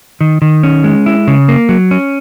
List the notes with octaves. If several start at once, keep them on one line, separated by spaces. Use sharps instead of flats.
D#3
D#3
C#4
G#3
E4
C#3
A#3
F#3
C#4